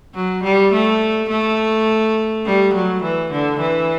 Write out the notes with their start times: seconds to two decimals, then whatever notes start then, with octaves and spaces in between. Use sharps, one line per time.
0.15 F#3
0.43 G3
0.73 A3
1.30 A3
2.46 G3
2.74 F#3
3.03 E3
3.31 D3
3.60 E3